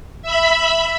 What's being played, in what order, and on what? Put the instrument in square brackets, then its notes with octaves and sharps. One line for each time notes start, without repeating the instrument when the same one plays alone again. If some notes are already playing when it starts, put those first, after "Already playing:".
[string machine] E5 B5